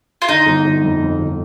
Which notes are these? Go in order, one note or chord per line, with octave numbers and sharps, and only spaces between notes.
F4
D3 D#4
G1
G1
F2
F2
G1